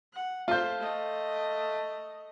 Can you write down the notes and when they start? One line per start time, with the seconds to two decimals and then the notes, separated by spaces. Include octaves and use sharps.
0.14 F#5
0.48 A3 F4 C5 G6
0.80 A3 D#5